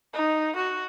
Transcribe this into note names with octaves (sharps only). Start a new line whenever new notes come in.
D#4
F#4